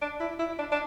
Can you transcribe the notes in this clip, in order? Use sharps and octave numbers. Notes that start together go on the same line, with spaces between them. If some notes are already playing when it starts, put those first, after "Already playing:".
D4
E4
E4
D4
D4